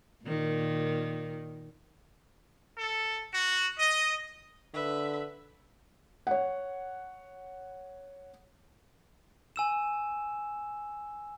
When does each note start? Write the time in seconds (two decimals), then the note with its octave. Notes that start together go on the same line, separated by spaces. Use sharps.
0.25 A#2 D#3
2.78 A4
3.32 F#4
3.77 D#5
4.74 D3 B4 E5
6.27 C#5 F#5
9.56 G#5 E6 E7